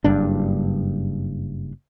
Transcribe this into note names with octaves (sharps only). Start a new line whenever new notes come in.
F#1 G2 D4